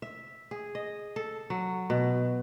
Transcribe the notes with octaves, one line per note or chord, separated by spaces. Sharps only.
E5
G#4
D#5
A4
F#3
B2